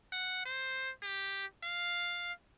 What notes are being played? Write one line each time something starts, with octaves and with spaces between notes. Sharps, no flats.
F#5
C5
G4
F5